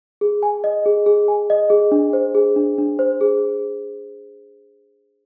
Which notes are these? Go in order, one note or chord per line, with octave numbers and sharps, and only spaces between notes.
G#4
G#5
D#5
G#4
G#4
G#5
D#5
G#4
D4
C5
G#4
D4
D4
C5
G#4